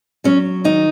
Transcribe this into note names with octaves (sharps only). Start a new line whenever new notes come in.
F#3 C#4
D#3 D#4